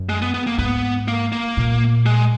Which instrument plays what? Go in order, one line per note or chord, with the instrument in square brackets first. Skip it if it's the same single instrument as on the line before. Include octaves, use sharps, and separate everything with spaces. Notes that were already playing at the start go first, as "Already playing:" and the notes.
Already playing: [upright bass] F#2
[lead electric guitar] G#3
B3
B3
A#3
[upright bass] G#2 [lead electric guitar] B3
[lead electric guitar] A#3
A#3
[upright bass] A#2
[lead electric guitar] G#3